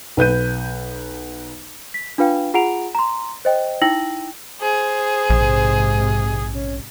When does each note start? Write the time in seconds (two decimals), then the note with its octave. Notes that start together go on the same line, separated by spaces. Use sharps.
0.17 B1 B4 G6 D#7
1.94 B6
2.18 D4 F4 B4 F5 G5
2.54 F4 G#4 F#5 A#5 D7 F7
2.95 A#5 C6
3.45 C5 D#5 G5
3.82 D#4 E4 G5 E6 A#6 F#7
4.62 G#4 C5
5.30 A#1 G#2 C3
6.52 C#4